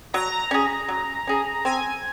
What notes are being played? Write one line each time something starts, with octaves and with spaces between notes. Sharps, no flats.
F#3 A#5
C#4 G#4
F#3
C#4 G#4
C4 G#5